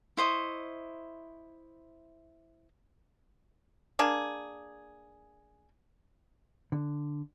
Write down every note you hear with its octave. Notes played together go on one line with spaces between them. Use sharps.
E4 C5 D#5 C#6
A#3 D4 G#4
D3